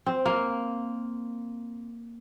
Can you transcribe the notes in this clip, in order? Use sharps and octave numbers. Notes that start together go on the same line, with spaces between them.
C4
A#3